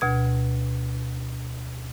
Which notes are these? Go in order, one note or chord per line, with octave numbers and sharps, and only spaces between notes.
D2 B2 G#6